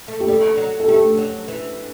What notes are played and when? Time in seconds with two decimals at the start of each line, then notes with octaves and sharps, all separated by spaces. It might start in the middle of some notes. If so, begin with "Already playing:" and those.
0.08 A3
0.20 G4
0.28 G3 A4
0.58 F#3
0.80 A4
0.88 A3 G4
1.18 F#3
1.48 E3